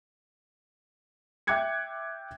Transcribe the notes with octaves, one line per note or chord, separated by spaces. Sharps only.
E5 G5 D6 F#6 G#6 C#7